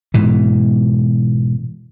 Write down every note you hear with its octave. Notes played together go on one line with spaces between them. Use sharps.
G#2 B2 E3